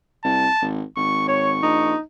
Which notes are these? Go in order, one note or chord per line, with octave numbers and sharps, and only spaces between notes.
C2 A5
G#1
G#1 C#6
C#5 C#6
A#1 D#4